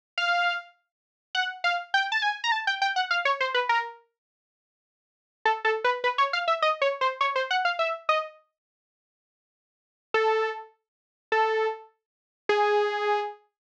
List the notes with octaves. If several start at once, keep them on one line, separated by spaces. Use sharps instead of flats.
F5
F#5
F5
G5
A5
G#5
A#5
A5
G5
G5
F#5
F5
C#5
C5
B4
A#4
A4
A4
B4
B4
C#5
F5
E5
D#5
C#5
C5
C#5
C5
F#5
F5
E5
D#5
A4
A4
G#4